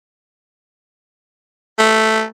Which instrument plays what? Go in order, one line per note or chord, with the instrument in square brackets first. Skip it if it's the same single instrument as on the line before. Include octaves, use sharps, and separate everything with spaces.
[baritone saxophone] A3